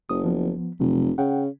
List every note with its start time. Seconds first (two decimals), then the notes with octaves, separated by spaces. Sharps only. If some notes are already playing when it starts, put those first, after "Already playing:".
0.09 F#1 D#6
0.25 F3 B3
0.80 F1 C3 F#3
1.18 C#3 F#5 G5